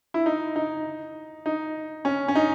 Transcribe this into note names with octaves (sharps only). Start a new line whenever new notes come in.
E4
D#4
D#4
D#4
C#4
C#4
D#4